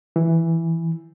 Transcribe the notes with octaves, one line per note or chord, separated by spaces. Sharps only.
E3